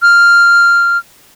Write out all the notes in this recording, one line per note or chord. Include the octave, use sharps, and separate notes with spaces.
F6